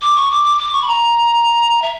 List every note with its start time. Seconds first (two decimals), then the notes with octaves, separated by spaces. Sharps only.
0.01 D6
0.16 C#6
0.30 D6
0.44 D6
0.58 D6
0.73 C#6
0.81 B5
0.87 A#5
1.82 E5